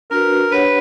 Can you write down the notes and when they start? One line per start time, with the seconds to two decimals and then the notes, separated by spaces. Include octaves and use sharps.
0.11 D4 F#4 A#4 B4
0.50 D4 G4 B4 C#5 F#5